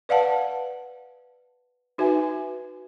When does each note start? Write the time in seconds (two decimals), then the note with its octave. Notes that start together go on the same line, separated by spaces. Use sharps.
0.09 B4 D5 F5 F#5 A5
1.98 D#4 F#4 B4 E5 G#5